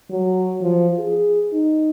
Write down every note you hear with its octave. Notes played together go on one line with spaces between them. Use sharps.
F#3
F3
G#4
D#4